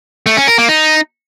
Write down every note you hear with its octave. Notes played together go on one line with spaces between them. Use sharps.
A3
C#4
A#4
A#3
D#4